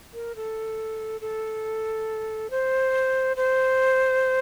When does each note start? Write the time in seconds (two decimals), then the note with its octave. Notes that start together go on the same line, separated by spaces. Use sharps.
0.14 A#4
0.36 A4
1.21 A4
2.50 C5
3.37 C5